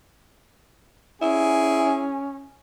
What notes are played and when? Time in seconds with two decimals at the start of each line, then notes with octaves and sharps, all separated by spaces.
1.22 C#4 E4 G#4